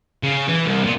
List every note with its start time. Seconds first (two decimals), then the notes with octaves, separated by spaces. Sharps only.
0.23 C#3
0.48 E3
0.66 C2
0.84 A#2